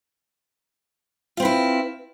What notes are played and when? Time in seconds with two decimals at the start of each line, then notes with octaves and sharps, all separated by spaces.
1.37 F4
1.40 C4
1.42 B4
1.45 E4